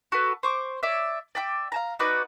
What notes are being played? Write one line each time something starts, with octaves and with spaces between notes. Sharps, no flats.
F#4 A4 B4
C5 C#6 D6
C#5 D5 E5
D5 E5 G5 D6
F5 A5 A#5
D#4 F#4 B4 D5